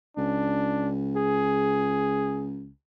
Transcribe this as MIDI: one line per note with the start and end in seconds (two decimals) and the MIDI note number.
0.17 2.70 37
0.17 0.92 62
1.16 2.50 68